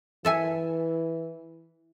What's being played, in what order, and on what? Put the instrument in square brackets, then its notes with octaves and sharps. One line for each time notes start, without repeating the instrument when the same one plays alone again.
[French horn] E3 [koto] A4 E5 G#5